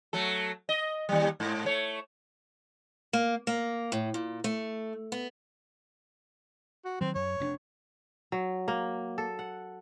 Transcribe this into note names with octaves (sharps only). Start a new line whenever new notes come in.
F#3 A3 A4
D#5
D#2 G3
G#2
A3 C#5
A#3
A#3
A2
A#2
A3
B3
F#4
D#3 F#3 C4
F#2 C#5
F1 C4 D4
F#3
A#3
A4
F#5